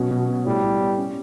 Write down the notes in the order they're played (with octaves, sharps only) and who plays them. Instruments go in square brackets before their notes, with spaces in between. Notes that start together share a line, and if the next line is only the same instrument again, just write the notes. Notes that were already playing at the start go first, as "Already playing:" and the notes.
Already playing: [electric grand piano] B2 C#4 [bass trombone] F#3
[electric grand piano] B2
B3
[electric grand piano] A2 [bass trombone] G3
[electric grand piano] A2
B3
C#4